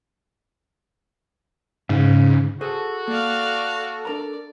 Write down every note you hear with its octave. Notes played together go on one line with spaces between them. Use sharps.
G#2 C#3
F#4 G#4 A4 C5
A#3 D5 F5
D4 A#4 D5 A#5